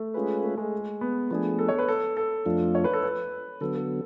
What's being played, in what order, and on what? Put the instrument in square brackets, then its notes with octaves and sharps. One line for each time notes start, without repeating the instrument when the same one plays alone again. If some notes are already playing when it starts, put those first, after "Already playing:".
Already playing: [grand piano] A3
[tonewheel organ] G#3 C#4 F4 G#4 B4
[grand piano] A3
G#3
B3
[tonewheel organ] F3 A3 D4 G#4 [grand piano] B3
[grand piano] A4
C#5
B4
A4
A4
[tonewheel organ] F2 F3 A3 D4 F4
[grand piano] C#5
B4
A4
B4
[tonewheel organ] D3 F#3 B3 [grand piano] A4
[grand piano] A4